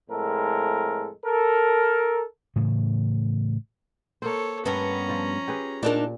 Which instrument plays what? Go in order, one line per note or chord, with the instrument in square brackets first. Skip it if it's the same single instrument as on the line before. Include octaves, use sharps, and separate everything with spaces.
[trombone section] F2 A2 G#3 A4 A#4
A4 A#4
[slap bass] A2 C#3 E3
[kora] A#3 A#4 C5 [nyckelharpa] A4 C#5
[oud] G2 B3 [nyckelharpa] C#4 A#5
[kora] F3 F4
G4 G#4 B4
[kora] A#2 [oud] D4 D#4 A#4